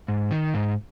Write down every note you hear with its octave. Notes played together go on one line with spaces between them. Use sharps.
G#2
D#3
G#2